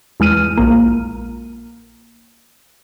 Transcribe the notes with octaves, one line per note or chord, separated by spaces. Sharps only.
E2 G#3 F6 D#7
A#1 A#3